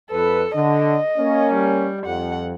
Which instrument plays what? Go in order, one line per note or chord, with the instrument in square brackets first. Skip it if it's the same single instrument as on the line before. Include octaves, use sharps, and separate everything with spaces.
[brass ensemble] F2 B4 [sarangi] A4
[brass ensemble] D3 [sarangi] D#5
[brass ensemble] A#3 C#4
[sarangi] G3
[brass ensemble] F2 [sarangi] F#5